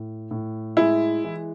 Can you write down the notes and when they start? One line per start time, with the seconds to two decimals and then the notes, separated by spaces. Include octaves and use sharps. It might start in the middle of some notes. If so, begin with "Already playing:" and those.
Already playing: A2
0.31 A2
0.77 G#3 E4
1.24 E3